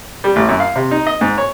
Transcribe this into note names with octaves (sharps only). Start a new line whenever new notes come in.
G3
A1
F#2
F5
C3
D#4
D#5
G#2
C#5